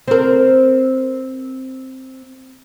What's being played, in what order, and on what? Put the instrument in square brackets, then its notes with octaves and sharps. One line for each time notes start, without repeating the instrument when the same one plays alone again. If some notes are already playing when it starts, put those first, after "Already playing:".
[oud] C4 A#4